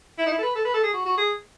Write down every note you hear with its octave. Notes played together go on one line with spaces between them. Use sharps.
E4
D#4
E4
A4
B4
A4
B4
A4
G#4
F#4
F#4
G#4